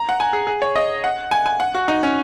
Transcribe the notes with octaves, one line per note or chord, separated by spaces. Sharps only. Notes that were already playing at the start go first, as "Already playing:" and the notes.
Already playing: A#5
F#5
G#5
G#4
G#4
C#5
D#5
F#5
G#5
G#5
F#5
F#4
D#4
C#4